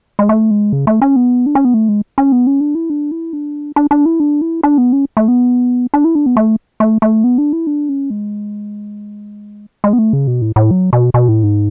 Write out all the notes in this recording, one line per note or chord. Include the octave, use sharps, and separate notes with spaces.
G#3
A3
G#3
C#3
A3
C#4
B3
D4
C#4
B3
A3
G#3
C#4
B3
C#4
D4
E4
D4
E4
D4
D4
D4
E4
D4
E4
D4
B3
C#4
A3
B3
D4
E4
D4
B3
A3
A3
A3
B3
D4
E4
D4
C#4
G#3
G#3
B3
A3
C#3
B2
A2
A2
F#3
B2
B2
A2
G#2